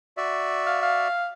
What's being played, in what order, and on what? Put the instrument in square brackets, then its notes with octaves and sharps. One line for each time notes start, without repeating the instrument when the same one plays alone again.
[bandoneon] F#4 D5 E5
[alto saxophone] F5
F5